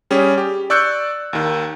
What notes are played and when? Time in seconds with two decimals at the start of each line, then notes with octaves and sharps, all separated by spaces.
0.10 G3 C#4 G4 G#4
0.38 G4
0.70 D5 C#6 E6 F#6 G6 C#7
1.33 D#2 D#3